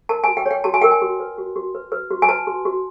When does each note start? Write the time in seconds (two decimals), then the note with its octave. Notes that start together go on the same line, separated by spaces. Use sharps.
0.09 A#4 A5
0.24 F#4 G#5
0.37 G5
0.46 C#5
0.51 G5
0.64 F#4 A5
0.74 G#5
0.82 A#4 G5
0.91 G#5
1.01 F#4
1.20 B4
1.38 F#4
1.56 F#4
1.75 B4
1.92 B4
2.10 F#4
2.22 G#5
2.29 B4 A5
2.47 F#4
2.65 F#4